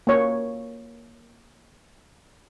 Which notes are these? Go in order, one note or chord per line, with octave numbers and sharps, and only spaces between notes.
A#3 C#5